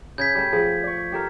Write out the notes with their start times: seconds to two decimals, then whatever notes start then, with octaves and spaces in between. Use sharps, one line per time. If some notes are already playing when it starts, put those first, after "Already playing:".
0.18 C#3 G6 G#6 B6
0.35 G3 A3
0.52 F3 G#4 F#5
0.83 D5 C#6
1.12 G4 A4 A#4